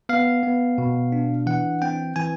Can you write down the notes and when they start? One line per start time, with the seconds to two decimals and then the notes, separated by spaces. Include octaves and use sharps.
0.09 B3 F5
0.43 B3
0.78 B2
1.12 D4
1.46 E3 F#5
1.82 C4 G5
2.16 E3 G#5